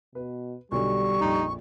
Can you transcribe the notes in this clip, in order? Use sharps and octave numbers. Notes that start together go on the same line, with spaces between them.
B2 B4
B1 B2 D3 G3 C#6
A#1 F2 D#4